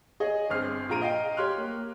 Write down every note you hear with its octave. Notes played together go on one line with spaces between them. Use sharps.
G#4 C#5 D#5
G1 C4 F6 C7
A#1 F4 G#4 A#5 D7 D#7
D#5 F5 G5
G4 C#5 C6 F6 F#6
A#3